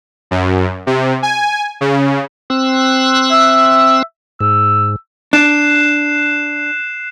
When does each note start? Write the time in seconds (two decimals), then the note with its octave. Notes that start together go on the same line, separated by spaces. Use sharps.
0.31 F#2
0.87 C3
1.23 G#5
1.81 C#3
2.50 C4 E6 F#6
3.31 E5
4.41 G#2 E6
5.33 D4 F#6 C7 E7